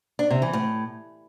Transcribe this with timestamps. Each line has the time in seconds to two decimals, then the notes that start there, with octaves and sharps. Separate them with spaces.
0.19 D4
0.30 C3
0.42 E3
0.53 A2